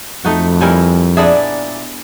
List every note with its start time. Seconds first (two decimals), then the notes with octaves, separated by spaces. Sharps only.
0.24 F2 A3 D#4 F#4
0.61 G3 E4 A#4 C#5 G#5
1.17 A#2 B3 D4 G#4 D5 E5